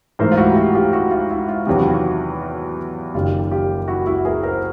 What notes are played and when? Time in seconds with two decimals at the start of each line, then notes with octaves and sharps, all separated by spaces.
0.19 G#2 E3 A3 A#4 C5
0.32 F4
0.37 E4 F#4
0.50 G4
0.56 E4 F#4
0.75 F4 G4
0.93 E4 F#4
1.11 F4
1.30 E4
1.48 F4
1.67 E2 C3 D#3 F#3 B3 G4
1.76 F#4
1.83 F4
1.91 E4 F#4
3.14 F#1 F#2 D#3 F4 G4
3.51 F4 G4
3.88 E4 F#4
4.07 E4 F#4
4.25 G#4 A#4
4.43 A#4 C5